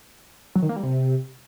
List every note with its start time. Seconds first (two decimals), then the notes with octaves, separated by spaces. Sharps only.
0.55 F#3
0.62 D#3
0.69 A#3
0.76 G3
0.83 C3